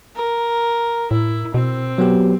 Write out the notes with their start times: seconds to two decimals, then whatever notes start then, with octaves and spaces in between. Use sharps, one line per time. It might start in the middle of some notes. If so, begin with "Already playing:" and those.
0.15 A#4
1.11 A2 E4
1.54 B2 C4
1.98 F#3 B3 G4